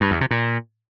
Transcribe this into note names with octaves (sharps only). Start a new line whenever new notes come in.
G2
E2
C3
A#2